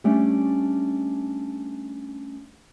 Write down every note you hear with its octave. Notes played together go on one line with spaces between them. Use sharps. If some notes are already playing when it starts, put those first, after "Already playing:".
G3 A3 C#4 D4